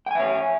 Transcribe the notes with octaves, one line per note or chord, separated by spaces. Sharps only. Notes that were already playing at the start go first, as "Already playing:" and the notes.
C#5 E5 G5 G#5